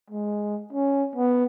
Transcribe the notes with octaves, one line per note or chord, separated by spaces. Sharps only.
G#3
C#4
B3